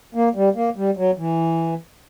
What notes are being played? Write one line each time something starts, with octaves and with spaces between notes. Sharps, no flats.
A#3
G3
A#3
G3
F#3
E3